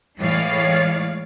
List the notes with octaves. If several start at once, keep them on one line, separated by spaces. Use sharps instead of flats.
A2 E3 G#3 C#5 D5 F5